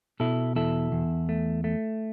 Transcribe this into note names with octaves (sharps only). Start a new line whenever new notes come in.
B2 E4 A4
E2 E4 A4
E2
A3
A3